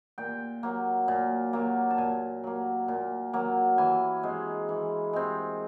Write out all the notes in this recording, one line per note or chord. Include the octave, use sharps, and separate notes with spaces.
A#2 G5
F#3 A#3
A#2
F#3 A#3
A5
A#2 G#5
F#3 A#3
A#2
F#3 A#3
E3 G#5
G#3 C4
E3
G#3 C4